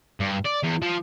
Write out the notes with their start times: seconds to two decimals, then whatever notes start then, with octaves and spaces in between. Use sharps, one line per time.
0.20 G2
0.46 D5
0.64 E2
0.82 F3